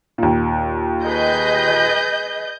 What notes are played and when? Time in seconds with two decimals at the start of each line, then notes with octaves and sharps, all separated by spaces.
0.18 D#2 A#2
1.04 G#4 B4 D#5 G6